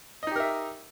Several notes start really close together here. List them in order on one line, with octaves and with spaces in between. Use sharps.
D#5 D#4 G4 A#4 E5